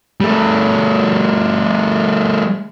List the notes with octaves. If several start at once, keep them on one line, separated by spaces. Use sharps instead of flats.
G3 A3